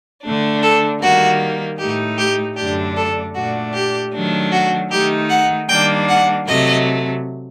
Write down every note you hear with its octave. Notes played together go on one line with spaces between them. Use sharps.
D3 A3 D4
A4
D#3 G3 A#3 F#4
A2 A3 D#4 G4
G4
F#2 D3 A3 D4 G4
A4
A#2 A3 D4 F#4
G4
D#3 F#3 A3 D4
F#4
D#3 A3 D#4 G4
F#5
D#3 G3 A#3 D4 G5
F#5
C3 F#3 A3 D#5